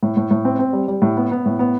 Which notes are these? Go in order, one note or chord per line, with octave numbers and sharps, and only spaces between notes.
A2
A2
A2
C4
C4
G3
G3
A2
B3
B3
A2
B3